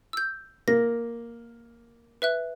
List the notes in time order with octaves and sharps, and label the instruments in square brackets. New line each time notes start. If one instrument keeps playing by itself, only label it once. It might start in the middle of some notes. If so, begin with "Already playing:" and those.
[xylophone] E6 G6
[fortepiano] A#3 [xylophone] A#6
[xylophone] B4 E5 F#6